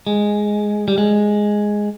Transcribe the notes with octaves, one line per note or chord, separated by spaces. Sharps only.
G#3
G3
G#3